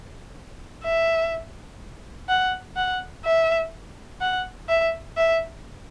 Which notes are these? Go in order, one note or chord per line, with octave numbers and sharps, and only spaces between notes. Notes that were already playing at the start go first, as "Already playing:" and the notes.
E5
F#5
F#5
E5
F#5
E5
E5